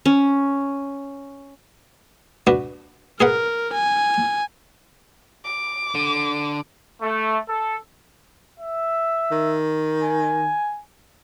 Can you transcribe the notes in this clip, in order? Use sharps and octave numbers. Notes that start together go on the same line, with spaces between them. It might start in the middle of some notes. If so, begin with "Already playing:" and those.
C#4
D4 F#4 B4
G#4 A#4 B4 F#5
G#5
D6
D3
A3
A4
E5
D#3
G#5